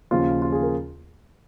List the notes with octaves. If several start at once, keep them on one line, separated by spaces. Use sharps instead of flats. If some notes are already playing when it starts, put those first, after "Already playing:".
D#2 C#3 F3 F4
F4
G#4
A#4